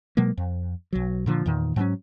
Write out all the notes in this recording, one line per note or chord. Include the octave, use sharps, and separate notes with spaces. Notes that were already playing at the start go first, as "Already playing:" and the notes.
B2 F#3 G#3 A#3
F2
B1 F#3
A#2 D3 F3
E2 A#2 D#3
G#2 F#3 B3 C#4